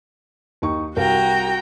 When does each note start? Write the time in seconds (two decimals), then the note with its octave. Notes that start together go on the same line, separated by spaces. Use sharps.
0.62 D#2 D#4 C#6
0.96 C2 F#4 A#4 F5 G5 A#5